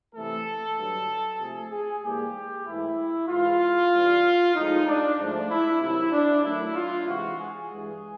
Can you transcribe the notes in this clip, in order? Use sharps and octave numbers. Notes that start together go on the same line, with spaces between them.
C3 E3 A3 A4
G2 D3 F#3
C3 F3 A3 G#4
G#4
G#2 E3 G3 A#3 G4
G#2 E3 A3 E4
G#2 E3 G#3 F4
G2 E3 G3
A2 F3 G#3 D#4
D4
G#2 F3 A3 D4
E4
C3 D#3 F#3 E4
D4
F#2 D#3 F#3 A3 E4
F4
C3 E3 G#3 F#4
G#4
G2 E3 G#3